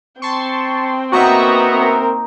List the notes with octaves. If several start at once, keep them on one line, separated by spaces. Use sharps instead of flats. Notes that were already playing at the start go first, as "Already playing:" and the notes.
C4 G5 A5 C6 C#6
A#3 B3 D#4 F#4 E5 A#5 C#6
C4 A#4